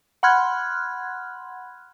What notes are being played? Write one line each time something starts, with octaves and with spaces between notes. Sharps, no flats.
F#5 B5 C6 F6 F#6 G#6